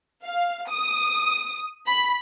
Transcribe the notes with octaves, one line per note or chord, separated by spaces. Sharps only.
F5
D#6
B5